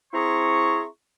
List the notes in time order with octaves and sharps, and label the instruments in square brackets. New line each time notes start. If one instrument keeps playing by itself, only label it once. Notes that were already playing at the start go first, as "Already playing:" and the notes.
[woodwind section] C4 E4 G#4 A#5 C6 C#6